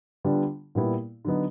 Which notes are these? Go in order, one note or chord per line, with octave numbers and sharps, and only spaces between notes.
D3 G3 B3 D4 F4
A#2 G3 B3 E4
D3 F#3 B3 D#4